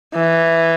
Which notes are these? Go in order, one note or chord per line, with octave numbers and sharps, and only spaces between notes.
E3